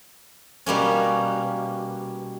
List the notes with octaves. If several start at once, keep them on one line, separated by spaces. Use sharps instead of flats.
B2 G3 A#3 C#4